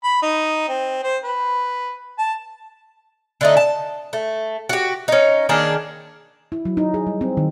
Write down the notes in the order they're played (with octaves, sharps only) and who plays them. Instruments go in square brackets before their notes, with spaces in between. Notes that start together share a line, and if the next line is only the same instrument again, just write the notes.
[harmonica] B5
D#4
C4
C5
B4
A5
[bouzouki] D3 A3 D#4
A5
A3
F#4 G4
C#4 D#4
D#3 A#3 D4 G#4
[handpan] E4
F#3
D#4
G#4
G3
C4
D#3